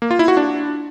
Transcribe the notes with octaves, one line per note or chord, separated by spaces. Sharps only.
A#3
F4
E4
F#4
D4